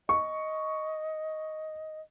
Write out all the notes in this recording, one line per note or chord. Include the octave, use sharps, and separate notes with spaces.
D#5 C#6